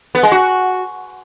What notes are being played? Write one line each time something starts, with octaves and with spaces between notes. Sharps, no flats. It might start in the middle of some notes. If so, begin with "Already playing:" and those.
B3
G#3
F#4